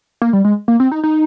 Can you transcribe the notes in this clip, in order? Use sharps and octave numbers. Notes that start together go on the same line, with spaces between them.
A#3
G3
G#3
A#3
C4
D#4
D#4